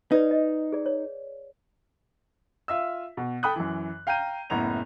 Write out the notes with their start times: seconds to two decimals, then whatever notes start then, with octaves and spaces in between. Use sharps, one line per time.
0.12 D#4 B4 D5
0.31 D#5
0.72 G#4 D5
0.86 C#5
2.68 F4 E5 E6
3.17 B2
3.43 A4 G5 B5 D#6 F#6
3.56 F#2 E3
4.07 F5 G5 A#5 G6 D#7
4.50 F#1 A2 B3 A#5 F7